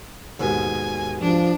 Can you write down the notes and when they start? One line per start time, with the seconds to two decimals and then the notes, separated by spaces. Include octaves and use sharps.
0.40 D#2 G#2 B2 G#5
1.20 F3 D4